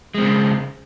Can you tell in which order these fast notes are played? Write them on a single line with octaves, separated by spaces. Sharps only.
G#3 C4 C#3